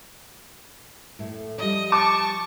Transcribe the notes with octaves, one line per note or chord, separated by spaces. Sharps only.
A2 A3
F3 G3 D#5
A5 C#6 D6